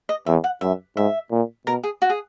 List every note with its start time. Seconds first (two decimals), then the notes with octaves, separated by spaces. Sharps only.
0.09 D#5
0.26 E2 E5
0.44 F#5
0.61 F#2 E5
0.97 G#2 E5
1.31 A#2
1.66 B2 A#4
1.83 G#4
2.02 F#4
2.10 G#4